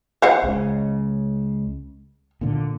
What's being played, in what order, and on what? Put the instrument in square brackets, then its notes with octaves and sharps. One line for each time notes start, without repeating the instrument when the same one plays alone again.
[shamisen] C5 F5 F#5
[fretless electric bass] C#2 C#3
A#2 D3